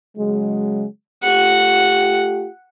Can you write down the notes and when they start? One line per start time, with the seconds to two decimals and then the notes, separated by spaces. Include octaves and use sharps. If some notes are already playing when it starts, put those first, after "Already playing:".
0.17 C#3 F#3 G#3
1.24 A3 F4 G4 F#5